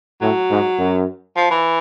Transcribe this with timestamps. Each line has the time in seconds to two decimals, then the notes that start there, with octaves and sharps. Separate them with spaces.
0.21 A2 F#3
0.50 G#2
0.78 F#2
1.36 F3
1.51 E3